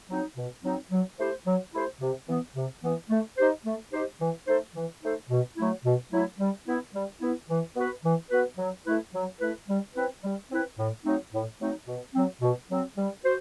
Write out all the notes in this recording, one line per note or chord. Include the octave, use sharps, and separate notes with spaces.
F#3 C4 D#4
B2
F#3 C4 D#4
F#3
A3 E4 G4 C5
F#3
A3 E4 G4 C5
C3
E3 B3
C3
E3 B3
A3
D#4 G4 C5
A3
D#4 G4 C5
E3
A3 D#4 A4 C5
E3
A3 D#4 A4 C5
B2
F#3 A3 E4
B2
F#3 A3 E4
G3
B3 E4
G3
B3 E4
E3
B3 F#4 B4
E3
B3 F#4 B4
F#3
A3 E4 B4
F#3
A3 E4 B4
G3
C4 E4 B4
G3
C4 E4 B4
A2
F#3 A3 C4 D#4
A2
F#3 A3 C4 D#4
B2
F#3 C4
B2
F#3 C4
G3
F#4 C5